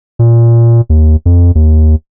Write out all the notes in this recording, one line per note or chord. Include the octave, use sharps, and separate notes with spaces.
A#2
D#2
F2
D#2